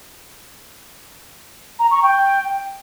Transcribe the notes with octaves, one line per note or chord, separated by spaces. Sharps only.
A#5
C#6
G5